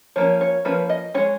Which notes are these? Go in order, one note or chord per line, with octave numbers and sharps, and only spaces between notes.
F3 A#3 C#4 C#5
C#5
F3 A#3 C#4 B4
D#5
G#3 C#4 C#5